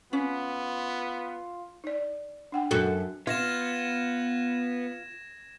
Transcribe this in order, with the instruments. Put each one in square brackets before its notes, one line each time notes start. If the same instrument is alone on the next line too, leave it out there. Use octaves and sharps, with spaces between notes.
[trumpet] B3 [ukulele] C#4 [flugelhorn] F4
[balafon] D#4 D5
D4 F#5 G5
[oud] F#2 F#4 A4
[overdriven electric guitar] B3 [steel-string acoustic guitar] F4 [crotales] G#6 A#6 E7